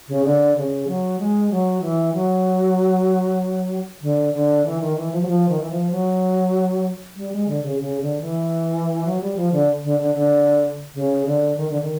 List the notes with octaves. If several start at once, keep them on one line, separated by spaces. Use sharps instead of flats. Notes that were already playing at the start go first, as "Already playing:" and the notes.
C#3
D3
C#3
F#3
G#3
F#3
E3
F#3
D3
D3
E3
D#3
E3
F3
F#3
F3
D#3
E3
F3
F#3
G3
G#3
D3
C#3
C#3
D3
E3
F#3
G3
F3
D3
D3
D3
D3
C#3
D3
D#3
D3
D#3